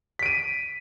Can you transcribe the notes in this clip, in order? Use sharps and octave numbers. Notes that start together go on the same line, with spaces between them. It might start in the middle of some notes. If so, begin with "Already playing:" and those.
B6 D7 D#7